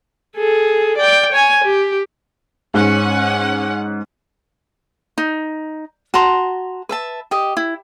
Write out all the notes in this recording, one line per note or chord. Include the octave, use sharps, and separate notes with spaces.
G#4 A4
D5 G5
C#5 G#5
G4
G#2 C#4 F#5
D#4
F#4 A5 A#5 C6
B4 E5 A5
G4 D#5
E4